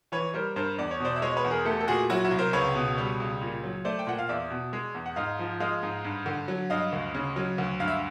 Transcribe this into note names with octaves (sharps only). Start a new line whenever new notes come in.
E3 B4 C#5
G3 A#4 C5
G2 A#4 C5
E2 D5
C#5
B2 C5 D5
E5
G#3 C#5 D#5
B4 C#5
E2
G#4 A#4
A3 G4 A4
A4
A#2 F#4 G#4
F#3 E4 F#4
E4 F#4
C2
A#4 C5
C#2 B4 C#5
B2
G3
C#2
A#2
F#3
A3 C5 D5
G5
A#2 F#5
F5
E2 D5 E5
B2
G#3
E2
F#5
G#2 D#5 F5
F3
G#3 D#5 F5
G#2
G2
D3
F#3
G2 D#5 F5
D2
C#3
F#3
D2
G2 F5
E5